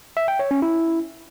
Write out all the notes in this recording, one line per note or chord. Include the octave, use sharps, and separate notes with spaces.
E5
G5
C#5
C#4
E4